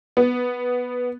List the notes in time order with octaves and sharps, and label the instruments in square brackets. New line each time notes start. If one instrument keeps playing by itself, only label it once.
[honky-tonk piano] B3